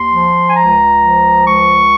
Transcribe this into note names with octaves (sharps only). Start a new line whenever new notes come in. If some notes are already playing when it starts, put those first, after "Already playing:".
Already playing: D#2 C6
F3
G#5
C#2 A#5
F3
C#2 C#6